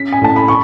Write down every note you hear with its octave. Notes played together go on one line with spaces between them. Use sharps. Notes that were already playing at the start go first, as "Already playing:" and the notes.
Already playing: C#4 B6
G#5
A2 A5
B5
C#6